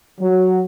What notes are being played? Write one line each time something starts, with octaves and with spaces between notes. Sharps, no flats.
F#3